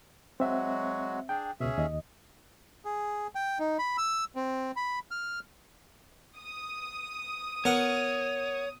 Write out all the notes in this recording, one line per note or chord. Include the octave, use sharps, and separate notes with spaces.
F#3 G#3 C4 F#4 E5
D4 G#4 G5
C#2 B2 C#4 G#4 E5
D#2 D#5
G#4
G5
D#4
B5
E6
C4
B5
F6
D#6
B3 A#4 C#5 F#5